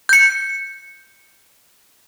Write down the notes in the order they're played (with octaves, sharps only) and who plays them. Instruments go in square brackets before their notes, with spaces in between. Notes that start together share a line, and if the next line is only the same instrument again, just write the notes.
[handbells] G6 C#7